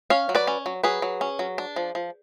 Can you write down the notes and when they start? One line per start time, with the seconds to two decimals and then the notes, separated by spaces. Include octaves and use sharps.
0.10 C#4 C#5 F5
0.29 F#3
0.35 B4 D5
0.47 C#4
0.66 F#3
0.83 F#3 G#4 B4
1.02 F#3
1.21 C#4
1.39 F#3
1.58 D4
1.76 F3
1.95 F3